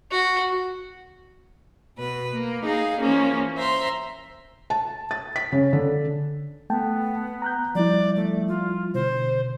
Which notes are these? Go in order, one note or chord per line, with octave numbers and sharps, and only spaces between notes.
F#4
B2 B4
A#3
D#4 G#4 F5
E3 F3 A#3 C#4
C5 E5 A#5 C6
A5
A6
B6
C#3
D3
A3 B3 G5 A5
A#5 F#6 G6
F3 G3 E4 D5
A3
F4
B2 D3 C5